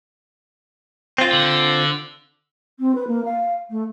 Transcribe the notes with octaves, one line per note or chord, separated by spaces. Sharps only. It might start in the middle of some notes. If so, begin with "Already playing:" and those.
C4 F4
D3
C4
B4
A#3
F5
A3